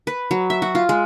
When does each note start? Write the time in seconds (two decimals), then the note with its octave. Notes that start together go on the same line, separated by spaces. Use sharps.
0.07 B4
0.31 F#3
0.50 E5
0.62 F#4
0.75 F4
0.89 G#3